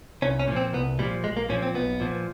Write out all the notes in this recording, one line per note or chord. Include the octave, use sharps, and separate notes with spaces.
C2 C#4
C#4
A#2 F3
C4
C2 B3
A#2 F3 G3
B1 G#3
A#3
A#2 F3 C#4
C4
B1 B3
A#2 F3